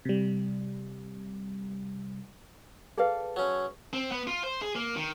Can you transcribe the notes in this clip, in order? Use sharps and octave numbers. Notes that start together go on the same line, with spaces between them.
C3 G3
G#4 A4 B4 D5 F5
F#3 C#4
C4
B3
F4
C5
G#4
A#3
D#3